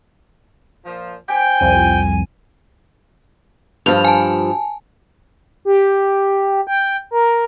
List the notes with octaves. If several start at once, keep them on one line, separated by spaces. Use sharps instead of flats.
A#2 F3
C5 G5 G#5
C2 F2 D#7
G2 F3 F7
G#5 A5
G4
G5
A#4